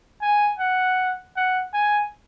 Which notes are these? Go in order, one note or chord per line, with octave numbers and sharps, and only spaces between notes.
G#5
F#5
F#5
G#5